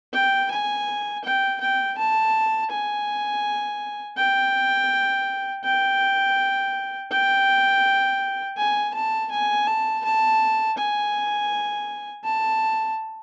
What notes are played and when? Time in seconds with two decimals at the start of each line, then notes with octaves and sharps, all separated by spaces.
0.14 G5
0.51 G#5
1.24 G5
1.61 G5
1.98 A5
2.71 G#5
4.18 G5
5.64 G5
7.11 G5
8.57 G#5
8.94 A5
9.31 G#5
9.67 A5
10.05 A5
10.78 G#5
12.25 A5